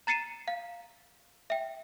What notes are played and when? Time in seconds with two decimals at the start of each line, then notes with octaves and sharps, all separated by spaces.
0.07 A#5 A6 C7 C#7 D#7 E7
0.48 F5
1.50 E5 G5